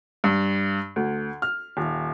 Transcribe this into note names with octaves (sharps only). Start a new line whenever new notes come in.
G2
D2
F6
D#1